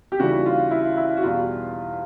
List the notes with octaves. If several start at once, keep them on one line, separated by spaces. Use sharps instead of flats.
G4
D#2 C#3 E3 G3 F#4
F4
E4
E4
F#4
E2 B2 G3 F4